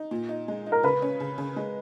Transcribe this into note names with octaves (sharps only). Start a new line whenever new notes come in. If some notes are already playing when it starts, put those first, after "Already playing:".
Already playing: D#4
A#2
D#4
G#3
D#4
A#4
C#3 B4
C#4
C#3
C#3
G#3